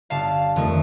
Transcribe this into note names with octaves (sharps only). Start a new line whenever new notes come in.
G1 F5 A5
F2 D#3 A3